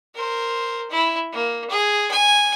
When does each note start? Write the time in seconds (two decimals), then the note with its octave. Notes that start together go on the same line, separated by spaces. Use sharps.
0.15 A#4 C5
0.90 E4
1.32 A#3
1.70 G#4
2.11 G#5